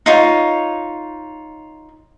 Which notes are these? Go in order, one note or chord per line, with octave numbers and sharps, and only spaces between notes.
D#4 F4 C#5